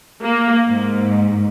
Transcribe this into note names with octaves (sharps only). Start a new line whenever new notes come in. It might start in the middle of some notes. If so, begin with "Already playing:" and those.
A#3
G#2